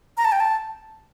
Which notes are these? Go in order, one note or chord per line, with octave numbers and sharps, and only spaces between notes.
A#5
A5
G5
A5